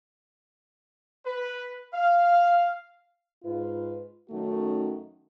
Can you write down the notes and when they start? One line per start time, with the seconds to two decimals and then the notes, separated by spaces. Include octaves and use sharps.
1.26 B4
1.94 F5
3.44 G#2 F4 B4
4.30 F#2 D#3 A3 C#4 D#4 F#4